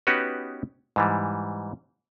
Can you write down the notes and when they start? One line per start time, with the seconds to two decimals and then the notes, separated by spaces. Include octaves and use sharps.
0.07 B3 C#4 D#4 F#4 G4 B4
0.96 G#2 E3 G3